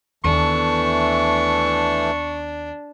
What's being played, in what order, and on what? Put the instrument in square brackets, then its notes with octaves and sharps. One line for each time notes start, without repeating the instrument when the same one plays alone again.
[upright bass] D#2 B3 [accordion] E3 A3 [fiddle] D4 [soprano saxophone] C#6